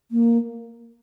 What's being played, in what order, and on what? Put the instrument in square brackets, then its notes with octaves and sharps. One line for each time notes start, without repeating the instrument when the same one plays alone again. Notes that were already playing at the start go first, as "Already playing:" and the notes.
[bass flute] A#3